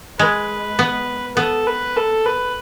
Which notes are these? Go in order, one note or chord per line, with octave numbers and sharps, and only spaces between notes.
G#3 B4
B3
B3 A4
B4
A4
B4